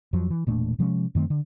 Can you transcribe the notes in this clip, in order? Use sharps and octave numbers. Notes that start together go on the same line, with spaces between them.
F2 F3 F#3
E3
E1 A#2 A3 D4
C3 F3 G#3 C#4
F#2 D#3 A3 C4
D3